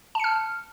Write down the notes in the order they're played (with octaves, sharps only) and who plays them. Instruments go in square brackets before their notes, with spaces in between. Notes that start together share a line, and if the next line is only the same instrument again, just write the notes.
[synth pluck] A5
C#7
F6